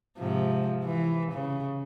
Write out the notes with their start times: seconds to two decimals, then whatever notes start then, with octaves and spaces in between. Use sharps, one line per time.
0.18 G#2 C3 F3
0.85 E3
1.32 C#3